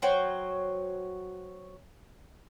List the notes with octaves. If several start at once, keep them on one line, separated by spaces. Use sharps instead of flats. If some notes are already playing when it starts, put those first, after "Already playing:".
F#3 F#4 C5 G5